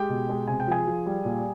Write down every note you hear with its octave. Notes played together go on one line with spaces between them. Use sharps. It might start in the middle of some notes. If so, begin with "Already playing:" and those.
Already playing: G#3 G4 G5
B2
G#3
C3 G#5
G5
F3 G#4 G#5
F3
G3
A#2